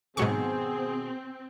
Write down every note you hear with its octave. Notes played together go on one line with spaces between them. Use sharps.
G#2 B2 D#3 F#3 C4 G#4 C#6